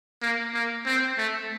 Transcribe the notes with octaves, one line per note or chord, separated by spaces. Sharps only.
A#3
A#3
C4
A3